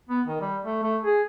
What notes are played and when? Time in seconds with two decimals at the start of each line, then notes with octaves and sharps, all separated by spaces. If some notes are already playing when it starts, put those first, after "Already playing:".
0.09 B3
0.27 D#3
0.41 G3
0.65 A3
0.83 A3
1.03 G#4